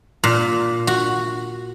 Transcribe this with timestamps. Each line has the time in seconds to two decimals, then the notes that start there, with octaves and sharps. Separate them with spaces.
0.24 A#2
0.87 F#4